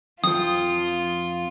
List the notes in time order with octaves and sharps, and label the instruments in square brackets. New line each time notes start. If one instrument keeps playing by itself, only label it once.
[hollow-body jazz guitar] F2 F3 [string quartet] F4 [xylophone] D#6